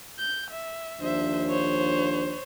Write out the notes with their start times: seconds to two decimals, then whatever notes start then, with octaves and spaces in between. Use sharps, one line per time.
0.19 G6
0.51 E5
1.01 D#2 F3 D4 C5 E5
1.50 C5 C#5